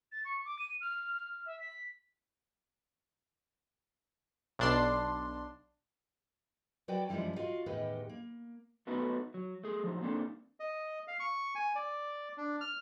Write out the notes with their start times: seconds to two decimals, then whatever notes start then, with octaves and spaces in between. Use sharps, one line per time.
0.12 A6
0.25 C#6
0.45 D6
0.59 D#7
0.81 F6
1.16 F6
1.46 E5
1.60 B6
4.59 B1 D4 C6
6.88 F#3 F#4 B4 D5 G5 A5
7.09 F#2 E3 F3 G3 G#3
7.36 F4 F#4 D#5 F5
7.66 E2 A2 D#3 G4 B4 D#5
8.09 A#3
8.87 A3 B3 D#4 F#4 A4 B4
9.34 F#3
9.64 A3 G#4
9.84 F3 F#3 D#4
10.01 A#3 C4 D4 D#4 A4
10.60 D#5
11.08 F5
11.20 C#6
11.55 G#5
11.76 D5
12.38 D4
12.61 F6